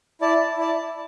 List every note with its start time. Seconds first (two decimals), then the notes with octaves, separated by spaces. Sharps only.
0.21 E4 D5 A5
0.57 E4 D5 A5